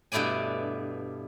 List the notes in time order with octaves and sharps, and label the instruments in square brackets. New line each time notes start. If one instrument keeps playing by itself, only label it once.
[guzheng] G2 B2 A3 E4 D5 G#5